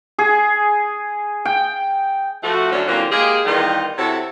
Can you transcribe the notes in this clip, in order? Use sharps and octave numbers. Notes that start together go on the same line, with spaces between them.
G#4
G5
F3 A3 F#4
D2 D3 F#3 C#4 D4 C5
D3 E3 F#3 A#3 C4 F4
G#3 A#3 G4 G#4
D#3 E3 G3 B3 F4 D#5
C3 E4 F#4 A4 C#5 E5